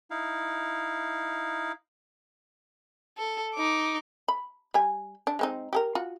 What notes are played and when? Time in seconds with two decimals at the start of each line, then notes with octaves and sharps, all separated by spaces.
0.11 D#4 E4 F5
3.18 A4
3.55 D#4 D6
4.28 B5
4.74 G3 G#5
5.27 D4
5.39 G#3 C4 D#4
5.73 G4 G#4 A#4
5.95 F4 F#4